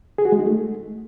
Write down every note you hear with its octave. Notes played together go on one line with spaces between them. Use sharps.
G#4
F#4
G#3
D#4
A3